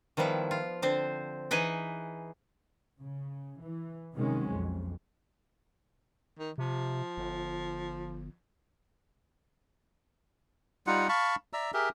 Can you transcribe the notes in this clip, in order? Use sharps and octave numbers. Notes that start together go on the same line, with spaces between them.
D#3 F3 G3 B3 E4
F4
D3 C4 C5
E3 D#4 G#4 B4 D#5
C#3
E3
C3 D#3 F#3 G#3 C4 C#4
B1 F2
D#3
C3 F3
G1
G3 D#4 F4 F#5
F5 A5 B5 C#6
D5 E5 A#5 E6
G4 G#4 A#4 E5